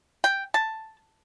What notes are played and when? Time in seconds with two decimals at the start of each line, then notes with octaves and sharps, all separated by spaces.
0.24 G5
0.54 A5